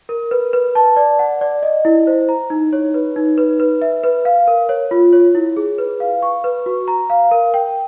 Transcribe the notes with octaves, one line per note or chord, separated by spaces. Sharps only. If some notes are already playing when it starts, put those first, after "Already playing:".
A#4
B4
B4
A5
D5
F#5
D5
D#5
E4
C5
A#5
D#4
C#5
B4
D#4
B4
B4
E5
B4
F5
A#4
C#5
F4
C#5
E4
G#4
B4
F5
C#6
B4
F#4
A#5
F5
A#4
G5